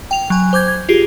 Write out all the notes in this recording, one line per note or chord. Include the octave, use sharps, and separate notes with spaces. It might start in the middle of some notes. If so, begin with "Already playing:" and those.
G5 F7
F#3 G#5
C5 D6 G6 G#6
G#6
F4 G4 G#4 C7